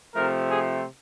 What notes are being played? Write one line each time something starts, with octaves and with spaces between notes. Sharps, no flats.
C3 F3 A3 C4 A#4
G#4